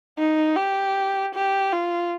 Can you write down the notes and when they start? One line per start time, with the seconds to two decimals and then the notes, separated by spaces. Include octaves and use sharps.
0.18 D#4
0.56 G4
1.35 G4
1.73 F4